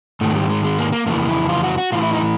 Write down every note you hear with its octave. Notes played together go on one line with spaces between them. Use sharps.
G#2 D#3 A3
G3
G#3
G#3
A#3
A#3
F2 C#3 E3 A#3
E4
F4
F#4
F#4
A2 E3 F4
E4
D#4